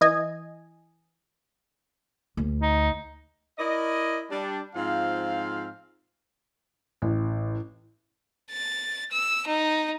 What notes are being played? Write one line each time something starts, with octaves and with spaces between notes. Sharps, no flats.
E3 D#5 G#5
D2
D#4
E4 A#4 D5 D#5
G3 D4
G#2 F3 C4 F4 F5
A1
A6
E6
D#4